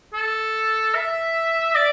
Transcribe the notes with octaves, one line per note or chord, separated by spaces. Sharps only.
A4
E5
D5